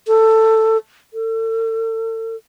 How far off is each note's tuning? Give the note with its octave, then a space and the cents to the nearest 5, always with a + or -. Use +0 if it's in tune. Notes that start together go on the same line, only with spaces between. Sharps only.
A4 +10
A4 +40